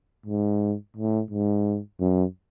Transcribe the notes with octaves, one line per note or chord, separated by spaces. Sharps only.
G#2
A2
G#2
F#2